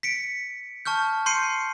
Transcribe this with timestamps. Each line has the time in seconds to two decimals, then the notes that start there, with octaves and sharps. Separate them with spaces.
0.03 B6 C#7 D7
0.85 A5 C#6 F6 G6
1.26 C6 G6 C7 C#7 D#7